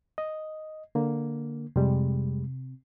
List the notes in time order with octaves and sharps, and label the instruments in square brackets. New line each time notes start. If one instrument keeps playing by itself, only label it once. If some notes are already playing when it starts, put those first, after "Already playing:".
[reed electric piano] D#5
D3 A#3
[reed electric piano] F2 G3 G#3 [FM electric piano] C3